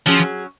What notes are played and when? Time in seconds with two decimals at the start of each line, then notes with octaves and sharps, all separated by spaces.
0.06 F3 F#3 C#4 G#4